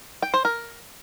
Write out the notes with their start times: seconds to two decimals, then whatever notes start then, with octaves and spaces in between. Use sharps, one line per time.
0.22 G5
0.34 C5
0.45 A#4